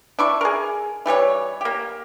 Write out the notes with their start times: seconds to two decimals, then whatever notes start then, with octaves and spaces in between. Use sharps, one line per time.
0.19 D4 E4 C#6
0.41 G#4 A#4
1.06 E3 G3 A3 C#5
1.61 A#3 G4